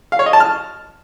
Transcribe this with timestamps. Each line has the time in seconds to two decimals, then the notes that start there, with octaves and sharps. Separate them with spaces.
0.12 F5
0.19 C#5
0.26 D#5
0.33 A5
0.40 F6